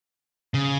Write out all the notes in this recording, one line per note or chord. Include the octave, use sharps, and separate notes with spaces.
C#3